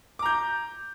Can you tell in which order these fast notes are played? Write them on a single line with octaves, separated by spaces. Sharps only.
D6 A#5 G6